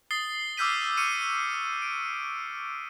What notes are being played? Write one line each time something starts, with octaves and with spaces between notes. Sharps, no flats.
D#6 A6 C7 G7
D6 E6 F6 G6 B6 D#7
C#6 F6 C#7 D#7
D7